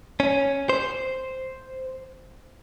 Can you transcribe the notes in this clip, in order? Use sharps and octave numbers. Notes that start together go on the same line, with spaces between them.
C#4
C5